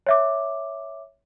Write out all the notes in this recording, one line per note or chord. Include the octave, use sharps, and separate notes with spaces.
C#5 E5 D6